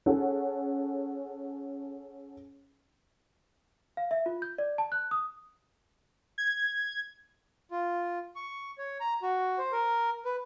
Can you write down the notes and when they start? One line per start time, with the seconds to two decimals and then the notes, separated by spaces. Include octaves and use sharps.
0.06 C#4 G#4 A4 C#5 F#5
3.97 F5
4.11 E5
4.26 F4
4.42 G6
4.58 D5
4.78 A5
4.92 F#6
5.11 D#6
6.38 G#6
7.71 F4
8.36 C#6
8.78 C#5
9.00 A#5
9.22 F#4
9.58 C5
9.72 A#4
10.25 B4